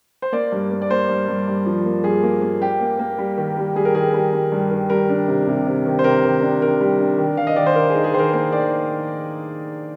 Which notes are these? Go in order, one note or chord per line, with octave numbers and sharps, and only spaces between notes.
C5
A#3 D5
G2
A#3
D5
A#3 C5
G2
G2
G2
F3
A#3
G2 G#4
A#3
A#3
G3 G4
A#3
A#3
G3
D#3
G3
G3 G#4
A#4
D#3 G#4
G3
G3
G2
D#3
G3 A#4
D4
C3
C3
C3
D#3
C5
C3 A#4
D#3
D4
D#3 A#4
G3
D4
D#3
D#3 F5
D#5
D#3 D5
C5
D#3 A#4
G#4
D#4
G#4
D#3 A#4 C5
A#3 C5
D#3 D5